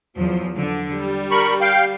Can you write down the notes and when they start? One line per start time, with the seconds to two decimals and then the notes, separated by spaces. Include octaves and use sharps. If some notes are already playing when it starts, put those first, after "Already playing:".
0.15 E2 F3 F#3
0.57 D3
0.91 G3
1.31 A#4 B5 C#6
1.61 F5 G5